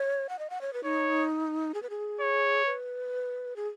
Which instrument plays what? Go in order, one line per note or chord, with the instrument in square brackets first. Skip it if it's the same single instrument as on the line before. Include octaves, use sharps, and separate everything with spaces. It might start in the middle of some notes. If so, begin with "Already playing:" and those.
Already playing: [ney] C#5
F#5
D#5
F#5
C#5
B4
[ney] D#4 [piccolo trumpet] C#5
[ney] G#4
B4
G#4
[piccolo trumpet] C#5
[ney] B4
G#4